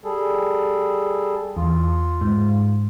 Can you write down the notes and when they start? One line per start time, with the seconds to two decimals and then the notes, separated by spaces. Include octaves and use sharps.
0.04 G3 G#4 A4
1.57 E2 F4
2.21 G#2